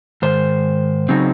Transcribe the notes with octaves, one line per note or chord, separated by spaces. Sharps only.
G#2 D#3 C5
C#3 F#3 C4 D#4